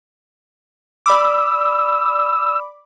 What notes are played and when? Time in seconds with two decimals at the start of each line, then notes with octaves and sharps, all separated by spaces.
1.06 D5 B5 D6 E6